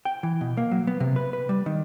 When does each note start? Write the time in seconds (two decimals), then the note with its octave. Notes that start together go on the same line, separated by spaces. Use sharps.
0.05 G5
0.23 E3
0.41 B2
0.57 A#3
0.71 F#3
0.87 B3
1.00 C3
1.16 B4
1.33 B4
1.49 G3
1.66 D#3